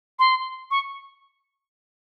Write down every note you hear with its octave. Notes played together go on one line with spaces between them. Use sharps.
C6
C#6